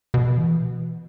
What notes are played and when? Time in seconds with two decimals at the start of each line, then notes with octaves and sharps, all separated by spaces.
0.14 B2
0.38 E3